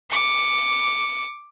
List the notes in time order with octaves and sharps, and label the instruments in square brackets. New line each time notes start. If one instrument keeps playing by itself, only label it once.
[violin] D6 C#7